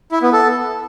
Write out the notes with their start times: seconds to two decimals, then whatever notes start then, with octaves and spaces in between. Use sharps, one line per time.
0.12 E4
0.22 B3
0.33 A4